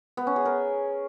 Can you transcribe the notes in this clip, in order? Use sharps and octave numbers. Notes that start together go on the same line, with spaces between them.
B3
C#4
G#4
A#4